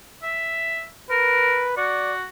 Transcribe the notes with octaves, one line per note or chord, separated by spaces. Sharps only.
E5
A#4 B4
F#4 D5